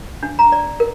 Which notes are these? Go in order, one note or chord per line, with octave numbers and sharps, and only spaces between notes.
D4
A#5
D5
A#4